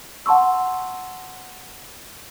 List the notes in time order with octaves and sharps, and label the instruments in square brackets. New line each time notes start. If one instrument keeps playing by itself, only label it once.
[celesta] F#5 A5 C6 C#6 E6